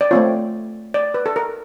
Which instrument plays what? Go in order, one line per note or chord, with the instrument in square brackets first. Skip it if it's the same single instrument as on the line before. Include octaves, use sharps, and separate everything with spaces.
[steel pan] D5
A3 C4 F4 C#5
D5
B4
A4
A#4